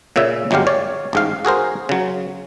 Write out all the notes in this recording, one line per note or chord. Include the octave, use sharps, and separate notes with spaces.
A#2 C#3 C#4 E5
G1 F#3 G#3 G4 F5
C#5 D5
A1 G#2 F5
F#4 G#4 A#4 C5
C#3 F#3